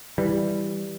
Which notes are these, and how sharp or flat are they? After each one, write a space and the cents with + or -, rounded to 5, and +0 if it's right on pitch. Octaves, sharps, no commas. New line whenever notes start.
E3 +0 G3 +5